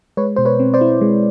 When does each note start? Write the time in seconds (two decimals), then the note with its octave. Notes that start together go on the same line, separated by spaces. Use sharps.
0.17 G#3 B4 C#5
0.36 B2 C5
0.45 B4 C#5
0.59 C4
0.74 C5 D5
0.81 E4
1.01 G#3